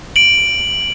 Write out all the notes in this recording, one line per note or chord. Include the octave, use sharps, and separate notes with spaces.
D7 F#7